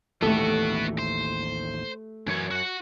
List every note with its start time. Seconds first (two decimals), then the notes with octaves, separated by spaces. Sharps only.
0.22 A1 D#2 E3 A3 B3 F#4 G4 A4
0.99 C5
2.27 F#2 E3 C#5
2.51 F#4 F#5